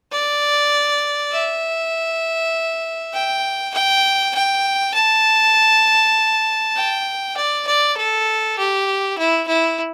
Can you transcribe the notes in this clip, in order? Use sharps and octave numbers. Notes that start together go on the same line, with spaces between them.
D5
E5
G5
G5
G5
A5
G5
D5
D5
A4
G4
E4
E4